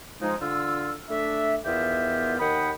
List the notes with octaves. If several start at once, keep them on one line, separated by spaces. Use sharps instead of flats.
F3 G#3 D#4
D3 F4 E6
A3 D4 E5
E2 D#3 B3 F4 G4 E5
D#2 D#3 F#5 G5 B5 D#6